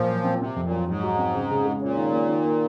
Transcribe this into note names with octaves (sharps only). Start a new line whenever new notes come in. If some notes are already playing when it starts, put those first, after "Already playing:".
Already playing: A#2 F3
F#3
C4
C3 C4
F2
A#2
F#3
G#2 F#3
F#4
C4
C#3
C#3
G#3
A#2 C#4
D#3
A#3
D#3
A#3